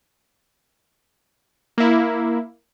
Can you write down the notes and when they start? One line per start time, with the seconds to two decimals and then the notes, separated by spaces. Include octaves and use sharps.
1.78 A#3 E4